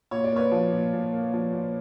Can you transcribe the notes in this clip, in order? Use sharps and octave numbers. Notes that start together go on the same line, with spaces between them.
A#2 C#5
D5
A#3 B4 C#5
F3
A#2
A#2
A#3
F3
A#2